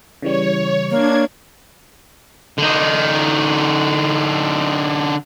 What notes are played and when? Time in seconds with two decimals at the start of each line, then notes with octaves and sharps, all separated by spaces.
0.22 C#3 E3 G3 C#5
0.90 A#3 D4 C#5 G#6
2.58 D3 D#4